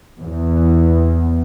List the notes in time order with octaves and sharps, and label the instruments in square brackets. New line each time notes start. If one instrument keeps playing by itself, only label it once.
[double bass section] E2